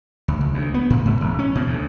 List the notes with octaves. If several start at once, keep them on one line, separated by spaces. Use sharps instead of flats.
D2
C#2
D2
B3
A2
G#2
E1
C#4
B2
D2